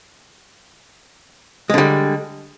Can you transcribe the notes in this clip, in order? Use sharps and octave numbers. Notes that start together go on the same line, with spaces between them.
D3 G3 G#3